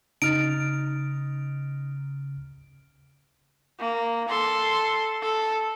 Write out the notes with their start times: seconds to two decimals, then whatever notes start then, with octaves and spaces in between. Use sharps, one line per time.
0.22 C#3 D#4 F6 A6 D7
3.79 A#3
4.28 A4 C6
5.22 A4